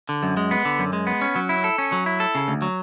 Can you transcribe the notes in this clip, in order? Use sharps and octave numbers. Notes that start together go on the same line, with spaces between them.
D3
F#2
G#3
B3
D3
F#2
G#3
B3
C#4
F#3
E4
A4
C#4
F#3
E4
A4
C#3
D2
F#3